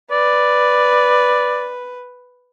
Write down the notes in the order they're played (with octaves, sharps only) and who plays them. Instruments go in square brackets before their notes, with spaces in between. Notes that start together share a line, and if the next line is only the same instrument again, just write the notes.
[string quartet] B4 [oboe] D5